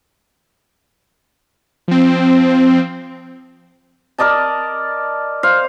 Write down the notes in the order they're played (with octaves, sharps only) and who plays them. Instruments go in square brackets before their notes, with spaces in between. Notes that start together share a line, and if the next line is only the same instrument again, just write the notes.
[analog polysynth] F3 C4
[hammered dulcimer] A#4 D5 D#5 A5
C5 F5